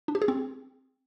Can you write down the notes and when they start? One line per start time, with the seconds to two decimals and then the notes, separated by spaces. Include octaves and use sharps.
0.08 D4
0.15 G4
0.22 G#4
0.28 C4